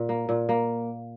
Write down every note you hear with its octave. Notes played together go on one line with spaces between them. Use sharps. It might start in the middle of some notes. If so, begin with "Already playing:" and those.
Already playing: A#2
A#3
A#2
A#3